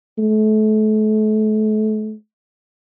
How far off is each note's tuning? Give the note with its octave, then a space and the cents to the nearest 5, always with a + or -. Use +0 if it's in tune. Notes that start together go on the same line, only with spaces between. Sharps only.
A3 -35